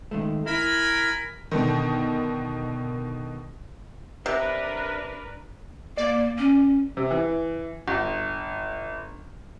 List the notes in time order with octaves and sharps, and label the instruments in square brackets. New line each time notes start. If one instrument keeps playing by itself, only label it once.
[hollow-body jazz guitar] D#3 G#3 A3
[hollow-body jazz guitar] E4 [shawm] A#4 [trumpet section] G#5 B5
[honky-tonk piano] B2 D3 D#3
[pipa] C3 [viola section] D4 A#4 B4
[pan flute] A#3 [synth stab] D5
[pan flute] C#4
[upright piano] C3
E3
G1